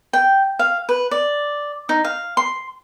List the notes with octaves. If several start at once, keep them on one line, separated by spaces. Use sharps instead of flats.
G5
F5
B4
D5
D#4
F5
C6